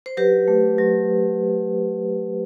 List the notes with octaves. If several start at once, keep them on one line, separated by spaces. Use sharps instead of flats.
C5
F#3 G4 B4
A3
F#3